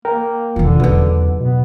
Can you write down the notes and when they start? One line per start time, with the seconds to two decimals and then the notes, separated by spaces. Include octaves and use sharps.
0.05 A#3 A#4 G5
0.56 E1 D3 D#3 F4
0.80 E2 C#3 F#3 D#4 F#4 B4
1.40 B2 B3